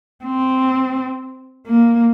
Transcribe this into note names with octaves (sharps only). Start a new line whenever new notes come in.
C4
A#3